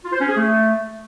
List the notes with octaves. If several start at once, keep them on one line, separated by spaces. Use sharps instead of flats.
F4
C5
C#4
G#4
A3